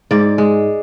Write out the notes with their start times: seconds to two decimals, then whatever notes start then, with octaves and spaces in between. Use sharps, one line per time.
0.11 G#2 D5
0.38 G#3